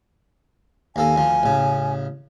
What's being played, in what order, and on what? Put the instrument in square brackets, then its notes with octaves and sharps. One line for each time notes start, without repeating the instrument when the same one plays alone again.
[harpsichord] D#2 A#3 A4 [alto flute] G#5
[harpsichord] D2 F3
A1 C#3